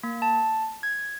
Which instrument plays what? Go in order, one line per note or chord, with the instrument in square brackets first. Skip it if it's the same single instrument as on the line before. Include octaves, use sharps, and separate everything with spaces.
[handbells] A#3
A5
G#6